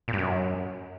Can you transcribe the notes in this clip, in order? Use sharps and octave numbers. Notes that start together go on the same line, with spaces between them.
A#2
G2
F#2